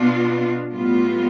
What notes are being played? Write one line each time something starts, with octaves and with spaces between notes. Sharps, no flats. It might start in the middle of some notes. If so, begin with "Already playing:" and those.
Already playing: B2 B3 D4 F4
A2 G3 B3 F4